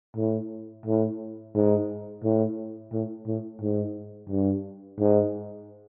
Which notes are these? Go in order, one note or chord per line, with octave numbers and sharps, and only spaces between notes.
A2
A2
G#2
A2
A2
A2
G#2
G2
G#2